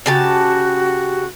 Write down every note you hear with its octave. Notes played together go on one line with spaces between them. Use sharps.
C#3 F#4 G4 A5